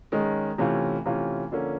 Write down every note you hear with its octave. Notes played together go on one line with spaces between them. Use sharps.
D#3 G#3 C#4
C3 E3 A3 C#4 F4
C3 E3 A3 C#4 F4
D3 F3 A#3 C#4